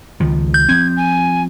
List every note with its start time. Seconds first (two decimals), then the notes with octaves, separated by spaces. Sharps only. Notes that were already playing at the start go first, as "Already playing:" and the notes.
0.20 C#2 D#3 F3
0.54 G6
0.69 F3 C4 G#6
0.97 G#5